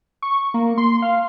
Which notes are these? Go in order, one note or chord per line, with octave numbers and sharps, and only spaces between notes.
C#6
A#3
C6
F5